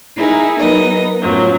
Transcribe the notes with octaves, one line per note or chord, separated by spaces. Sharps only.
D#4 E4 G#4 A#4
F#3 B3 D#4 A#4 B4 D#5
F#2 A2 F3 F#3